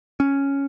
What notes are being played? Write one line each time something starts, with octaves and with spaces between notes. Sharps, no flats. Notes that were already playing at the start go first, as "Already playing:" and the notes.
C#4